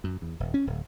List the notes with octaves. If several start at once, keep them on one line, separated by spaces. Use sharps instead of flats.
F#2
E2
D#1
C#4
D1